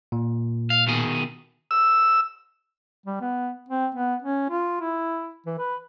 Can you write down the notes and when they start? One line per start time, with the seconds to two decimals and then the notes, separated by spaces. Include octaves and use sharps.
0.12 A#2
0.70 F5
0.87 B2 D#3 G#4
1.71 E6
3.06 G3
3.21 B3
3.69 C4
3.95 B3
4.23 C#4
4.50 F4
4.81 E4
5.46 E3
5.59 B4